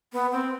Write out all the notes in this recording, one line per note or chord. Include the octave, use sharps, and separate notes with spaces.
B3
C4